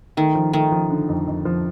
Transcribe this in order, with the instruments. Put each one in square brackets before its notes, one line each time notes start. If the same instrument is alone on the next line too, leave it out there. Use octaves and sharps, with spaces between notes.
[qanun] D#3 [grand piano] A3
[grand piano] F3
[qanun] D#3 [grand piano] A3
[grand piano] F3
D3
F2
F2
F3